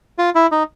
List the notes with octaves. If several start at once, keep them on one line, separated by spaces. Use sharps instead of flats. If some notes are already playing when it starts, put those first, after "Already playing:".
F4
E4
D#4